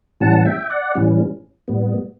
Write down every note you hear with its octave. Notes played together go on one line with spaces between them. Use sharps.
A2 E3 G3 C#4 F#5 A5
E5 G5
D5 F#5
A2 E3 G3 C#4
A2 G3 B3